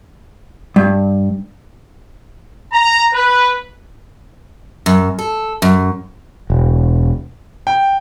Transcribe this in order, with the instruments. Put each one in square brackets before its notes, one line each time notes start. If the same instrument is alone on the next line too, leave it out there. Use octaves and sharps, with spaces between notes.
[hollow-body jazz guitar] G2
[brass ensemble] A#5
B4
[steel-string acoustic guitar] F#2
A4
F#2
[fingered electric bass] E1
[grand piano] G5